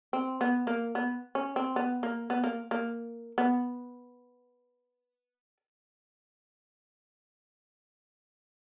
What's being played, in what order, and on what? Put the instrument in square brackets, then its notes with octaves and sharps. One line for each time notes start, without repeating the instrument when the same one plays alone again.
[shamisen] C4
B3
A#3
B3
C#4
C4
B3
A#3
B3
A#3
A#3
B3